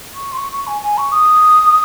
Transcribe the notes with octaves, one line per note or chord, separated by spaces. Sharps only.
C#6
C6
C#6
C#6
G#5
G#5
C#6
D#6